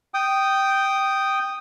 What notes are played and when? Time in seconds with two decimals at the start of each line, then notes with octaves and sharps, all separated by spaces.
0.14 G5 D#6